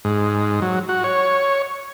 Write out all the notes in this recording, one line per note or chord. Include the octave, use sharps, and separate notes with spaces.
G#2
F#3
F#4
C#5